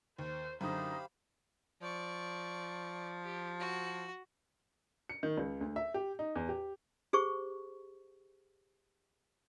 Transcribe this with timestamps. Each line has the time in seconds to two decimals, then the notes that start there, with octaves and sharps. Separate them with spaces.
0.19 D#2 C5
0.61 F#2 D3 D#4 G4 C5 F5 B5
1.82 F3 D5 C#6
3.24 G4
3.60 F#4
5.09 C#7
5.23 D#3
5.38 C#2
5.61 D2
5.76 E5
5.94 G4
6.19 D#4
6.35 E2
6.49 G4
7.13 G4 G#4 C5 C#6